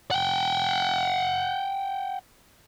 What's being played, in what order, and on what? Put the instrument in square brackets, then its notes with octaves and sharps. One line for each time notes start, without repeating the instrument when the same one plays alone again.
[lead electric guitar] F#5 G5